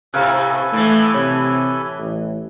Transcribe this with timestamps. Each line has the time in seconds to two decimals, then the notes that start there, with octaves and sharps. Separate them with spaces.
0.14 A2 C3 A4 B4 F5 G#5 F6 F#6
0.73 A2 E3 A3
1.14 C3 C#5
1.99 A1